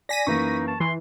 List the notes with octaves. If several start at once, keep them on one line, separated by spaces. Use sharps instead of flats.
D5 G#5 A#6 B6 D#7
F#2 E3 A#3 D#4 C#6
A5
E3 C6